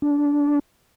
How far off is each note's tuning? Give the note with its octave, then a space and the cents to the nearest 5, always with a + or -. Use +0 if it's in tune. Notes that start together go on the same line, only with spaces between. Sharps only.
D4 -20